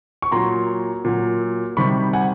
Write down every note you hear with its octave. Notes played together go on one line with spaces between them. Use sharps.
C#6
A#2 F#3 A#5 C6
A#2 F#3
C3 D#3 G3 B5 C#6
F#5 G#5